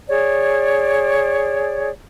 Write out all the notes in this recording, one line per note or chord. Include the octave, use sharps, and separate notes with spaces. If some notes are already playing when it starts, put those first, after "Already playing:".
G#4 C#5 D5